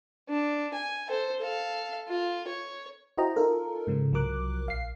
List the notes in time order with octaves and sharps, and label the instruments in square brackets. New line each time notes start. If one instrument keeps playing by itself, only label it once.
[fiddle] D4
G#5
A4 C5
A4 F5
F4
C#5
[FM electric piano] E4 F#4 C5 D#5 G5 A#5
D#4 F4 A4 A#4
G#2 C#3 F3
C2 F3 F#3 A#4 D6 F#6
A#1 F5 C7